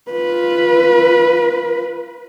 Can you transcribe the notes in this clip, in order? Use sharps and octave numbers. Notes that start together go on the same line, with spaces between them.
F4 B4